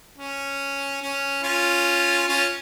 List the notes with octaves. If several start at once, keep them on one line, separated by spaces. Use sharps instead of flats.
C#4
C#4
C#4 F4
C#4 F4